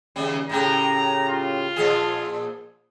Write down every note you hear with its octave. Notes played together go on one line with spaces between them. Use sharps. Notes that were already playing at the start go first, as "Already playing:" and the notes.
D#2 C#3 G3
A2 C#3 G4 A#5
F4
A#2 F3 G#4